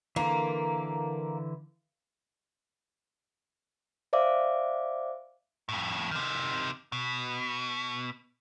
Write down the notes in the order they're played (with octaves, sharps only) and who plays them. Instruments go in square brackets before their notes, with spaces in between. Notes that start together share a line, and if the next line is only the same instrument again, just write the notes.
[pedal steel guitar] D3 E3 [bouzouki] A#3
[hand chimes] C5 D5 E5 F5 D6
[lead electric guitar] F2 A2
C3 D#3
B2